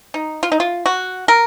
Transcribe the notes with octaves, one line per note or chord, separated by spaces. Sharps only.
D#4
F4
D#4
F4
F#4
A#4